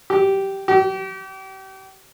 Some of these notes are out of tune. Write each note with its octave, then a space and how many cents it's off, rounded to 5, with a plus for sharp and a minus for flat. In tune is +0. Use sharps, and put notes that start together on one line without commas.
G4 -10
G4 -35